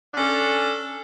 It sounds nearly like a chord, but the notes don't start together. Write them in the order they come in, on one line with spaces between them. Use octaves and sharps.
D4 C#4 A4